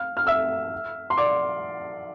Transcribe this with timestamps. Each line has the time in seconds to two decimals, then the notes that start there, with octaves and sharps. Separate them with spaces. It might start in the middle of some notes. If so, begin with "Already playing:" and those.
Already playing: F5 F6
0.17 F6
0.27 E5 E6
1.10 C6
1.17 D5 D6